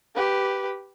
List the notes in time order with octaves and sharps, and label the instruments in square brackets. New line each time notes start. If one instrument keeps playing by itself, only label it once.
[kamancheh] G4 B4